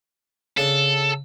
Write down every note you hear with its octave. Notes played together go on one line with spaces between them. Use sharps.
C#3 D4 A4